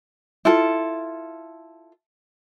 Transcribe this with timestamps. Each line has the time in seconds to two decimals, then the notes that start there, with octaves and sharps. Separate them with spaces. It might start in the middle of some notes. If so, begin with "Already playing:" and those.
0.45 E4 F4 A4